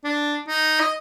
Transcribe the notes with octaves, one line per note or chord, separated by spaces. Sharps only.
D4
D#4
D#5